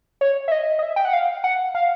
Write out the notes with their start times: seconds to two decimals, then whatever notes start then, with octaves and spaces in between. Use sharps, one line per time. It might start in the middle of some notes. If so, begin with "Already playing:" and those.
0.21 C#5
0.48 E5
0.52 D#5
0.79 D#5
0.83 E5
0.96 G5
1.05 F#5
1.13 F5
1.44 F#5
1.75 F5